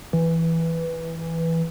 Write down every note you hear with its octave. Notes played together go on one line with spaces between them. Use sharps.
E3